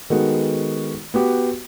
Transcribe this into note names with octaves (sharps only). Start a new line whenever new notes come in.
D#3 G#3 B3 F#4 A4
B3 F#4 G4